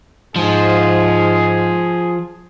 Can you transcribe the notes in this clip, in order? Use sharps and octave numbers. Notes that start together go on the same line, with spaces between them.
G#2 F3 G#4